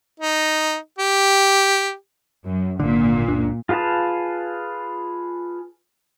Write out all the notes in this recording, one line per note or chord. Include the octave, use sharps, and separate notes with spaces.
D#4
G4
F#2
G#1 A#2 D3
F#1 C#2 D4
F4 G#4 B4 F5 A5